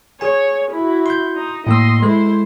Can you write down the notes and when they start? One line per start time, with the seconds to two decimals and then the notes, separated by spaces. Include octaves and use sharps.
0.21 G#4 C#5 G#5
0.71 E4 F#4
1.06 C6 G6
1.36 D#4
1.67 A2 A#3 D#5 C6 E6
2.02 G#3 E4 A4 C5